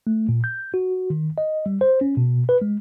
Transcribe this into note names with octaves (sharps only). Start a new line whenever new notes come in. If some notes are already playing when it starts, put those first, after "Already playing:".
A3
A#2
G6
F#4
D#3
D#5
G3
C5
C#4
B2
B4
G#3